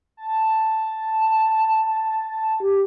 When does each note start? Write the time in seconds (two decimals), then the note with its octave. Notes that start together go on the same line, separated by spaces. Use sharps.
0.17 A5
2.60 G4